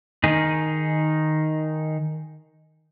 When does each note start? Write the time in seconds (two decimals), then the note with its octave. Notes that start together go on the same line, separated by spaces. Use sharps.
0.24 D#3 D#4 G#4